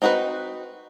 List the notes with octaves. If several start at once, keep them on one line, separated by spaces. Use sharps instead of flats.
C4 D#4 F#4 G#4 B4